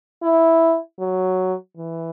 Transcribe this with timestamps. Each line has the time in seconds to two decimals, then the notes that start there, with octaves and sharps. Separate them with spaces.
0.23 E4
1.00 F#3
1.77 E3